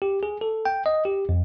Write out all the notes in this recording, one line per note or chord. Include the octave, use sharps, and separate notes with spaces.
G4
G#4
A4
G5
D#5
G4
F2